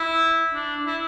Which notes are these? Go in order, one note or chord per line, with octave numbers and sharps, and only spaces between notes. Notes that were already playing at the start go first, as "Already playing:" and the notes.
Already playing: E4
D4
E4